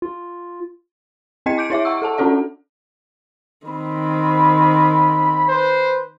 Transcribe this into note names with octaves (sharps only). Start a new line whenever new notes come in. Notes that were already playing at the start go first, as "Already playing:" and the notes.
F4
C4 E4 D#5 G5 G#6 C#7
D6 G6 C#7 D7
E4 C#5 E5 D6
F#5 C#6 E6
A4 F#5 A5
C#4 D4 F#4 A4 D5 F#5
D#3 C4 B5
B4 C5